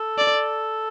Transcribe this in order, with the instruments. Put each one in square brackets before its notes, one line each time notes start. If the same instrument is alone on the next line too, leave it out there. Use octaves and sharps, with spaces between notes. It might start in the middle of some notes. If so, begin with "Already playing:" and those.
Already playing: [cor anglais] A4
[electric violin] D5